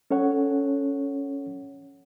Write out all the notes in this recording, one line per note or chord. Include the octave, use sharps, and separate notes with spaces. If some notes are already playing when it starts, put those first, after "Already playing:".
C#4 A4 C#5 F#5